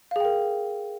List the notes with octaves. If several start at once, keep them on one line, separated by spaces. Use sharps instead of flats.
G#4 A#4 F5 G5